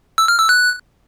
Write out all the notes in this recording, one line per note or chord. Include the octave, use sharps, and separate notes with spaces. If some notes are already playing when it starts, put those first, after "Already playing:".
E6
F6
E6
F#6